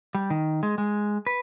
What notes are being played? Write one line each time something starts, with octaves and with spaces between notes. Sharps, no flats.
G3
D#3
G#3
G#3
B4